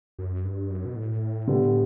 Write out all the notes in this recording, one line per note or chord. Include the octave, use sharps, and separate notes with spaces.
F#2
G2
F#2
B2
A2
D3 G3 B3